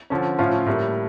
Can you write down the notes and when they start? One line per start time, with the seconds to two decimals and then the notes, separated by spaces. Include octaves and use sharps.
0.10 D3 F3 C#4
0.39 A2 F3 C#4 F4
0.66 A2 G3 A#3